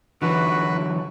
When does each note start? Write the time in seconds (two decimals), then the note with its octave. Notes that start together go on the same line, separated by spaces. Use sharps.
0.22 D3 E3 F#3 F#4 B4